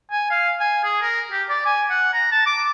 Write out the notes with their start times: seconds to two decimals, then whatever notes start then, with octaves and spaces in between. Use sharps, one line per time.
0.11 G#5
0.31 F5
0.60 G#5
0.84 G#4
1.02 A#4
1.32 G4
1.49 D5
1.66 G#5
1.90 F#5
2.13 A#5
2.32 A5
2.46 D6